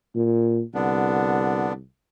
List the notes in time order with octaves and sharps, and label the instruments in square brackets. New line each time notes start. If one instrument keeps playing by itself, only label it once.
[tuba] A#2
[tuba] C2 [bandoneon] D3 B3 D4